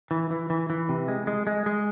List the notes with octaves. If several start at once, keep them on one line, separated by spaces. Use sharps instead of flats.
E3
E3
E3
E3
C3
G#3
G#3
G#3
G#3